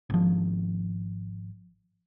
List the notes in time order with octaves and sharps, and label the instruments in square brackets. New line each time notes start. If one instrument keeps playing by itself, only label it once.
[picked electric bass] G#1 F3